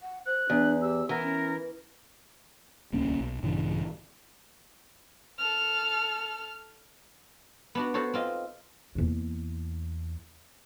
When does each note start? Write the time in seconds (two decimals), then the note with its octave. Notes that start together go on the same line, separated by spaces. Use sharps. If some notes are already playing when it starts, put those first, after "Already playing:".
0.01 F#5
0.26 C5 F#6
0.50 E2 D4
0.82 G4 E6
1.09 E3 A#4 F#5
1.22 C#4
2.93 D1 C2 A#3 C#4
3.20 B1
3.42 A#1 G2 C#3 E3
5.38 A4 F6
7.75 B3 D4 F#4
7.94 B3 F#4 A4 C5 C#5
8.14 C4 F4 D#5
8.95 E2 A#3